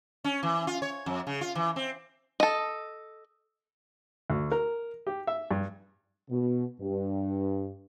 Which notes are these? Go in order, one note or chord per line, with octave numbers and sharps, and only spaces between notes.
C#4
E3
F4
C#5
F2
C#3
F4
E3
C4
A4 D#5
D2
A#4
G4
E5
G2
B2
G2